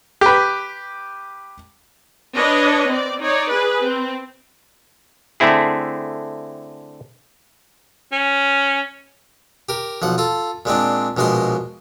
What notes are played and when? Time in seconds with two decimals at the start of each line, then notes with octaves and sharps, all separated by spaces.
0.21 G4 B4
2.36 D4 B4 C#5 D#5
2.89 C4 D5
3.20 D#4 C#5 D5
3.50 G#4 B4
3.83 C4
5.40 D3 A3 C4 E4 G#4
8.12 C#4
9.69 G4 A#4
10.02 B1 F3 F#5
10.18 F4 A4
10.65 A#2 G#3 C4 D4
11.17 A#1 B2 G#3 A#3 C6